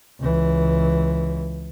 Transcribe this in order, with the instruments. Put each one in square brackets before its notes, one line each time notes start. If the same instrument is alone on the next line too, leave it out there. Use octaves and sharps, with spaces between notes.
[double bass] C#2 E3